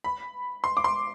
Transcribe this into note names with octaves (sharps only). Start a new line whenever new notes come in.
B5
C6
D6
C6